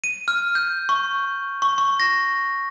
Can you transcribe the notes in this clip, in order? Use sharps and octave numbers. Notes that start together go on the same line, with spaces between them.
D#7
F6
G6
C#6
C#6
C#6
A#6